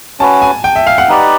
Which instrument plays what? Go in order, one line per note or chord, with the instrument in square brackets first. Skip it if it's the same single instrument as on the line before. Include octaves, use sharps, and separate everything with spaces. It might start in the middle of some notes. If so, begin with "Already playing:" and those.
[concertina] C#4 F#4 B4 [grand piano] A5
[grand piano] G#5
G5
E5
F5
F#5
[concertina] D#4 G4 B4 D5